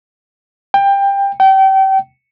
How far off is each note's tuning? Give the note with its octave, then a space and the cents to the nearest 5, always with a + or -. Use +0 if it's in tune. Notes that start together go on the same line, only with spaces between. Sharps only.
G5 +20
G5 -30